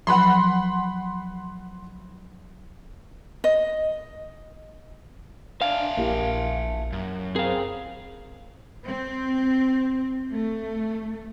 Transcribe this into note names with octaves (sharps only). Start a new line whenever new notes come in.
F3 F#3 F#5 B5 C6
D#5
D4 E5 F5 G#5 A5
A#1 A#3 E4 G4
F#2
C4 G#4 A#4 F5
C4
A3